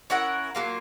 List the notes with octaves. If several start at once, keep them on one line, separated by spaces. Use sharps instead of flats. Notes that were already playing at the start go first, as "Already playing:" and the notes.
C#4 E4 A#4 F#5
F#3 A#3 F4